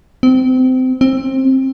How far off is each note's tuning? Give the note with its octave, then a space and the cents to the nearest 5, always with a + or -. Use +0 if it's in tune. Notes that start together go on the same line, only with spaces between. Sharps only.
C4 -25
C4 +20